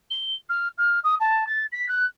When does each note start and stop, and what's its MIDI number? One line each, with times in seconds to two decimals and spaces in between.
0.10 0.35 103
0.49 0.68 89
0.78 0.99 89
1.04 1.15 87
1.20 1.44 81
1.47 1.64 93
1.72 1.88 95
1.88 2.05 90